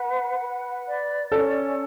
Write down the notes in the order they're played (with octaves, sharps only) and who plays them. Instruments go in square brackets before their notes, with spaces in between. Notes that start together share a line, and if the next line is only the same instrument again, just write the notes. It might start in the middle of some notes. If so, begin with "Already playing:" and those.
Already playing: [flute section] B4 F#5
B4
D5
[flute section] C#4 [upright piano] A4